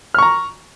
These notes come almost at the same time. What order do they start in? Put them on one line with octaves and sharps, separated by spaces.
F6 C#6 A#5